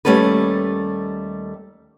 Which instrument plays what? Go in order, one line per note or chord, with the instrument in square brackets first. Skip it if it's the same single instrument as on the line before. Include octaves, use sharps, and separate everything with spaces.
[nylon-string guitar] D#2 G3 A3 C#4 A4 B4